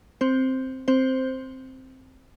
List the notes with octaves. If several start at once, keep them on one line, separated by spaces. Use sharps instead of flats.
C4 C5
C4 C5